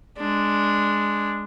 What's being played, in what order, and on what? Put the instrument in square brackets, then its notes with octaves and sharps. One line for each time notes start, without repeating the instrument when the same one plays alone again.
[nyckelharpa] G#3 D4